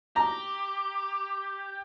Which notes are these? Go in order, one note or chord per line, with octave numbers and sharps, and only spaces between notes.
G4 A#5